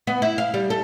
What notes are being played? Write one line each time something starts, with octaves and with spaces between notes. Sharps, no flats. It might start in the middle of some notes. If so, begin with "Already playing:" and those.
B3
E4
F5
G3
A4